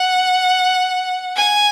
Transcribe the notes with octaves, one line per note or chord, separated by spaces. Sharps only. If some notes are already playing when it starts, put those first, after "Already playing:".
Already playing: F#5
G#5